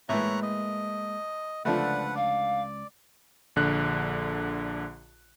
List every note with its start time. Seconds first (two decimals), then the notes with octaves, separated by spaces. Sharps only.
0.09 A2 E3 G#3 A#3 C#5 E5 A#5 F#6
0.43 D#5
1.65 C#2 D3 F3 A3 B4 D5 F#5
2.15 D5 F5
3.56 A#1 D3 F#6